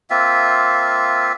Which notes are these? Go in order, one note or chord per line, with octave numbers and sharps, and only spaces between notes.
A#3 C4 F4 E5